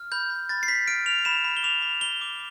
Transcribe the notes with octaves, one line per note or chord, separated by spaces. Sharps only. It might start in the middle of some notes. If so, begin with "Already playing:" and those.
Already playing: F6
B5 G6
B5
B5 A6
C7
B5 B6
F6 D7
F6 F7
B5 E7
B5
G7
D6 F7
B5
B5 G7
D6